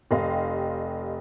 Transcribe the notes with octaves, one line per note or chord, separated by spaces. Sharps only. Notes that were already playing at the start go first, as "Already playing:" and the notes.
F1 G4 D#5 F5 C6